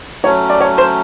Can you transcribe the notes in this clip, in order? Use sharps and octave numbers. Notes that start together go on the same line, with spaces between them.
F#3 A3 C#4 C#5
D5
C#5
C5